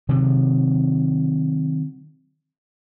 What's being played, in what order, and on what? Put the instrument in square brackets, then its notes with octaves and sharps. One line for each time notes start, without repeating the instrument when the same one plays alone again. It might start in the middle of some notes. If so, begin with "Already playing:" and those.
[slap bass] C3 D#3 F#3